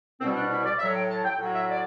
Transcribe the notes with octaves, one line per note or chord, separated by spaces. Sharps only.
C2 B2 G3 C4
D4
E4
D5
A2 F#3 E5
G5
A5
G5
A2 F#3
E5
D5